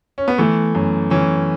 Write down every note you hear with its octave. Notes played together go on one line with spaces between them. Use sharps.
C#4
B3
E3 A3
F#2
E3 C#4